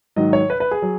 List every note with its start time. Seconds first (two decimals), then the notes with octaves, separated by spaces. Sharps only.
0.16 G#2 D#3 F#3 D#5
0.33 C#5
0.50 B4
0.60 B4
0.71 G#4
0.82 F#3